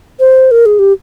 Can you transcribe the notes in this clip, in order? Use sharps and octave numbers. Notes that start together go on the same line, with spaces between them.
C5
A#4
G#4
G4